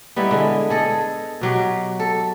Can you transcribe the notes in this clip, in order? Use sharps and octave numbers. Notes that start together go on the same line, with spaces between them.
G3 B3 D#4 E4
D3 G#3
G#4 A4 D#5
B2 F#3 G4
A4